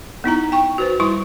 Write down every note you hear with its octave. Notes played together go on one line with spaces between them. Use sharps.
B3 D#4 E4 A#5
G5 C#6
F#4 B4 C5
G3 E4 C6 C#6